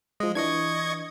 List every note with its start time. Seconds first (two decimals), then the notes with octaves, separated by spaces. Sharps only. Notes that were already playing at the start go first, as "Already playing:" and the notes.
0.20 F3 G#3 D#5
0.35 E3 D4 D#5 C#6 G#6